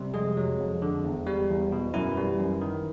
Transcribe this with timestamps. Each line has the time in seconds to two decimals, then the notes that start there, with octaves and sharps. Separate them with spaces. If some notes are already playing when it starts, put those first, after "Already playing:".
Already playing: C3 G3
0.14 F2 G#3 G#4
0.37 F#3
0.60 F2
0.82 D3
1.04 E2
1.27 G3
1.49 E2
1.72 B2
1.93 F#2 E3 E4
2.17 G3
2.39 F#2
2.61 D#3